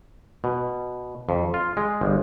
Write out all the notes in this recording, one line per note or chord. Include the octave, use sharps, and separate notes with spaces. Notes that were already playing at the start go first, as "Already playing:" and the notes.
B2
F2
F4
G#3
G1